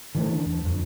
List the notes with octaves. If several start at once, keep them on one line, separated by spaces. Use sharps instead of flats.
D3 E3 A3
D4
E2
F2